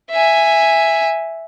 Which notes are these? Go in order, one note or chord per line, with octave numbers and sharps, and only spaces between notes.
E5 G#5